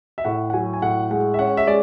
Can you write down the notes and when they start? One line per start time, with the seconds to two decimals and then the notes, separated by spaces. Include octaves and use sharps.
0.18 E5
0.24 A2 F#5
0.50 F#5
0.53 F#3 G#5
0.73 G#5
0.82 A2 F#5
1.10 G#3 F#5
1.34 E5
1.39 C#4 F#5
1.57 E5
1.67 G#3 D5